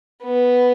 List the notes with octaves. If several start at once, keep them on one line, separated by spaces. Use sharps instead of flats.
B3